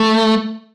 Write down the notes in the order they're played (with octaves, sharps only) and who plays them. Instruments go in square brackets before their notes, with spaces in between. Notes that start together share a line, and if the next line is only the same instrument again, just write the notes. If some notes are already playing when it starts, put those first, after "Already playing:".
Already playing: [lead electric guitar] A3